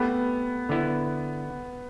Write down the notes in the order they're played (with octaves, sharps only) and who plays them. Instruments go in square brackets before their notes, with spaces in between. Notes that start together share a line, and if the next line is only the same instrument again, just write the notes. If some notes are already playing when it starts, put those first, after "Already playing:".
Already playing: [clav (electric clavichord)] A3 G4 B4 [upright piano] B3
[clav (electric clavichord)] D3 B3 E4